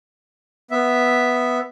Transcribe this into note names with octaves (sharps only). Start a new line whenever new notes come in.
B3 E5